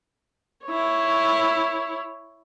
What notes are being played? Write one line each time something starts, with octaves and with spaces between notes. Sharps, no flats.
E4 C#5